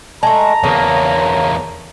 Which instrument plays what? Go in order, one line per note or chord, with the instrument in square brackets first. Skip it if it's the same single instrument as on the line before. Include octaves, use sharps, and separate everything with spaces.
[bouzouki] G#3 A3 [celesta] A5 [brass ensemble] A#5
[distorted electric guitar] E2 A#3 [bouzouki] C#3